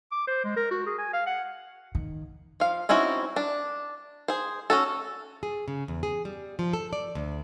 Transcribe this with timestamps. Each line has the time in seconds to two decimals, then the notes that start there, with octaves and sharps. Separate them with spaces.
0.12 D6
0.27 C5
0.45 G#3
0.56 A#4
0.71 F#4
0.86 G#4
0.98 G#5
1.13 F5
1.27 F#5
1.95 D#3
2.60 F3 F5
2.89 C4 C#4 D#4 E4 F#4
3.36 D4
4.28 G#4 C5
4.70 C#4 F#4 A4
5.43 G#4
5.68 C#3
5.88 E2
6.03 G#4
6.25 G3
6.59 F3
6.73 A4
6.93 D5
7.15 D2